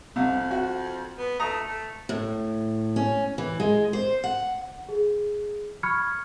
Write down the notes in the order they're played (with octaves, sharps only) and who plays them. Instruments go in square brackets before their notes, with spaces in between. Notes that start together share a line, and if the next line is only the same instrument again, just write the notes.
[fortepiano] C2 [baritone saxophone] F2
[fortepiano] F#4
[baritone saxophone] B3
[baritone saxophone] A3 [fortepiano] A#5 D#6
[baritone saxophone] A3
[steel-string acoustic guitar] A2
C#4
E3
G#3
C5
F#5
[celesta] G#4
B5 C#6 F6 G#6 C#7